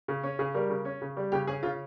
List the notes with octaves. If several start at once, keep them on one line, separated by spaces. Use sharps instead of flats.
C#3
C#4
C#3 G#4
G3 A#4
C#3
C#4
C#3
G3
C#3 G4
C#4 G#4
C#3 F4